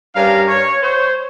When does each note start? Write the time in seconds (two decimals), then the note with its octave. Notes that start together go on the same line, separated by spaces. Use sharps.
0.16 G2 G3 C#4 D4 A#4 F5
0.48 C#5
0.82 C5 C#5